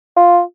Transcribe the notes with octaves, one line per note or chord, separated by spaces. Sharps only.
F4